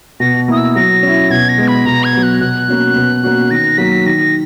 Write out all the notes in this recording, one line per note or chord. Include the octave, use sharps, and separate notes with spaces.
B2 A#6
A#3 E4 D#6
E6
F#3 A#6
C#4 E4
B2 G#6
A#6
G#3 B3
B5
B2 A#5
G#6
F#3 B3
F#6
B2 F#6
A#3 C#4 F#4
B2
A#3 C#4 F#4
D#3 A#6
F#3 A#3 B6
D#3 A#6